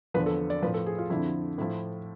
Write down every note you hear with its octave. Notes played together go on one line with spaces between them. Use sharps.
E2 D3 F3 B4
A4
D5
A2 F3 B4
A4
G#4
F4
F2 D3 F3 E4
A2 F3 E4